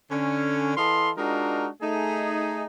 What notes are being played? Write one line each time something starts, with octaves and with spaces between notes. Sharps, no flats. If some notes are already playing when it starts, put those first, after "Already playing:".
D3 C#4
E3 A4 D#5 F5 C6
G#3 D4 D#4 F4 F#4 A#4
A3 D#4 G#4